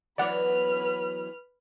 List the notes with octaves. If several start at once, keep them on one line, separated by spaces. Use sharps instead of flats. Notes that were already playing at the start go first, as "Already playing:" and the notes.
E3 F#3 B3 B4 D5 F#5 F6